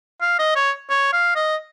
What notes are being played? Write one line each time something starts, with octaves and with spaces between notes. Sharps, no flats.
F5
D#5
C#5
C#5
F5
D#5